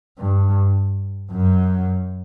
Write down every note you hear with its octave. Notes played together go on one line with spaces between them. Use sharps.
G2
F#2